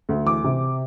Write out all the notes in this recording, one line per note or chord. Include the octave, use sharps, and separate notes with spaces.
D2
E3 D6
C3